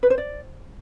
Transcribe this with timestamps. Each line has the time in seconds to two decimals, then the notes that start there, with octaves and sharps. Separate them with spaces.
0.03 B4
0.10 C5
0.18 D5